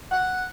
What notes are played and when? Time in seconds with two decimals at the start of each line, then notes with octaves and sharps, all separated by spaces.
0.11 F#5